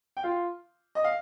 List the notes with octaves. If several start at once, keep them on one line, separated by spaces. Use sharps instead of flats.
G5
F4 F5
D#5
F5